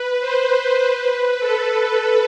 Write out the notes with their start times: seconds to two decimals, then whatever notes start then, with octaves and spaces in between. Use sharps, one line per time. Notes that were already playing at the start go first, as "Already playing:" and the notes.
Already playing: B4
0.20 C5
0.80 B4
1.39 A4